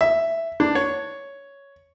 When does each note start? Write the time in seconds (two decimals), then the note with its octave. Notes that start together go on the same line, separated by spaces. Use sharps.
0.01 E5
0.60 D4
0.75 C#5